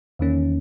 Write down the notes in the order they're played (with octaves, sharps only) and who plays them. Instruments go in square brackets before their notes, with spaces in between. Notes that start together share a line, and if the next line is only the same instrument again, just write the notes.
[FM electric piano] E2 D#3 A#3 C#4